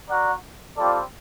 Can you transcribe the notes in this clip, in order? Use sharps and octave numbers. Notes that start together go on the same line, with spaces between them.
F#4 A#4 D5 F#5
G3 C4 F4 A4 D5